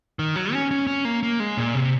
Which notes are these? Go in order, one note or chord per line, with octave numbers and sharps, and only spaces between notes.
D#3
F#3
C#4
C#4
C#4
A#3
A#3
G#3
A#2
C3